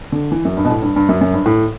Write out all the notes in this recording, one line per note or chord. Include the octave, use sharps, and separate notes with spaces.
D3
E3
F#2
G2
B2
A2
G2
G2
F#2
F#2
G2
A2